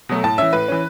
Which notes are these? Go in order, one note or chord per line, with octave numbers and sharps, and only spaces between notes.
B2 F#3 A3
A2 A5
E3 C#4 E5
A2 B4
E3 C#4